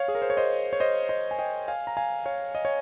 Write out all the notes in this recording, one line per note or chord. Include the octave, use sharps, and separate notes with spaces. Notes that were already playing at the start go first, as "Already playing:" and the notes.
Already playing: C#5 F5
G#4
A#4
C5
C#5
C5 D#5
C#5
C5 D#5
C5 D#5
G#5
D#5 G5
F5 G#5
A#5
F5 G#5
C#5 F5
D#5
C#5